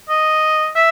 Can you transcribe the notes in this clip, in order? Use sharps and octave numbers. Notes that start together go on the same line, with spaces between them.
D#5
E5